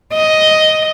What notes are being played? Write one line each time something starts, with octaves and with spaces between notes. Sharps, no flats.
D#5